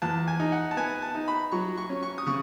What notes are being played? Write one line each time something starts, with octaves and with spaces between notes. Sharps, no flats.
E2 A5
G#5
D#4
F#5
A5
B3 G#5
A5
D#4
B5
F#3 C#6
C#6
C#4
C#6
D#6
C#3 C#6